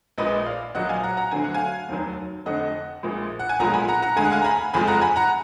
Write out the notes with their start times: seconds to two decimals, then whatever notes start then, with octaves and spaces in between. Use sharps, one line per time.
0.18 A#1 A#2 G#3 B4 D#5
0.46 D5 F5
0.75 A#1 A#2 F#3 D#5 F#5
0.89 F5 G#5
1.03 F#5 A#5
1.17 F#5 A#5
1.31 D2 D3 F#3 G#5
1.44 F#5
1.54 F5 G#5
1.89 F1 D#2 D#3 F#3
2.46 F1 F2 D3 D#5 F#5
3.03 A#1 A#2 F3 G#3
3.39 F#5
3.49 G#5
3.59 B1 A#2 F3 G#3 F#5 A#5
3.74 G#5 B5
3.88 F#5 A#5
4.02 F#5 A#5
4.16 D2 D3 G#3 G#5
4.25 F#5
4.32 F5 G#5
4.42 A#5
4.44 G#5 B5
4.74 F#1 F2 F3 G#3 G#5 B5
4.87 F#5 A#5
5.01 G#5 B5
5.16 F#5 A#5